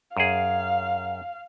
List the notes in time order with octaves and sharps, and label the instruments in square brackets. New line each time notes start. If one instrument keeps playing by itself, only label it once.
[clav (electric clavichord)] F#2 G#4 [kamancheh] F5